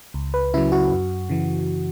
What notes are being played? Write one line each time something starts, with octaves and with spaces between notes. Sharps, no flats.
C#2
B4
C#3 F#3 E4
F#4
F#2
C#3 E3